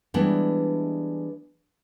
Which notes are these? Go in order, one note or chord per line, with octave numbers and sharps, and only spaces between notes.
E3 G3 G#3 B3 D4 E4